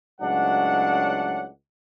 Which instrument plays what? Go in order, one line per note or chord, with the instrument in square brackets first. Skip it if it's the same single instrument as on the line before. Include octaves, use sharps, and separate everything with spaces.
[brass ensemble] C#2 A2 F#3 D4 F#5